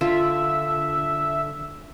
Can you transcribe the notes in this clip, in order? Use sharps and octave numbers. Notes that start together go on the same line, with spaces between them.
D3 F4 E5